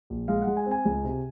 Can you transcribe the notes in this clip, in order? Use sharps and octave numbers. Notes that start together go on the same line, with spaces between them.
A#1
G#3 F5
F#5
G#3
G#5
C4
G#5
C#2
C3